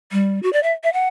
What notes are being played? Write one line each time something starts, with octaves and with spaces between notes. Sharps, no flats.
G3
F#4
D5
E5
E5
F#5